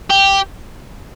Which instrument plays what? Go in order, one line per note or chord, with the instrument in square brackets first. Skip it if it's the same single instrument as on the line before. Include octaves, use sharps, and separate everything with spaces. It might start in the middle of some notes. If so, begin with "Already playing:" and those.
[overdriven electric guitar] G4